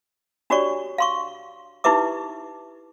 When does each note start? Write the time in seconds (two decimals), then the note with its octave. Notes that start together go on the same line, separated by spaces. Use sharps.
0.50 D4 F#4 G4 C#5 D5 C#6
0.98 F5 C6 C#6
1.84 D#4 E4 G4 B4 E5 D6